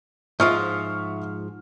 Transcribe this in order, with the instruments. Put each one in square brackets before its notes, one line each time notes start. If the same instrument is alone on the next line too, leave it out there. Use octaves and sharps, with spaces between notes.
[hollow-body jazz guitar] G#2 F3 F4 [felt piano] E5 C#6 F6